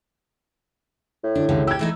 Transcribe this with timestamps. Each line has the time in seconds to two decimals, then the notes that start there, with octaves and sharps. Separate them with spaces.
1.24 A2
1.35 D3 D4 E4
1.49 C#2 D3 D#3 G3
1.67 G4 E6 G#6
1.79 E3 A3 D#4